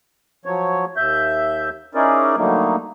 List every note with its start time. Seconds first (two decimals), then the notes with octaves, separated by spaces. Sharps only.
0.45 F3 F#3 C#5
0.97 D#2 E5 G6
1.95 C#4 D#4 E4 G#4 A#4 D5
2.37 D3 F#3 G3 A3 A#3 D#4